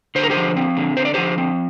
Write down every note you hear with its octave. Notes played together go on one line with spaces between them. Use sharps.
D3 C5
A#4
G4 C5
F3
C4
D3
D3 C5
D5
F3 G4 C5
C4